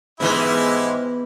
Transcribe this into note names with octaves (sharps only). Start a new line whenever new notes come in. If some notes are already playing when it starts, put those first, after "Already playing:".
G#2 E3 G#3 B3 E4 G4 B4 E5